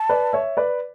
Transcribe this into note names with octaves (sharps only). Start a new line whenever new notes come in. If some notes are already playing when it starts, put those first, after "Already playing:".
Already playing: A5
B4 D5
C#5 E5
B4 D5